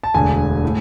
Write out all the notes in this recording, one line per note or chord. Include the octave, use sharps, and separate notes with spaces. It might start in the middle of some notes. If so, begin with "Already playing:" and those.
A5
E1 D2 D3 G#5
A2